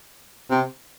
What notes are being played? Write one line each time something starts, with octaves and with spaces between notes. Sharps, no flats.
C3